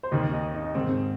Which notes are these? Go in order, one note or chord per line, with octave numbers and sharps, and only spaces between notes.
C5
D#2 D#3 D#5
D#5
D#4
G#2 D#3 C4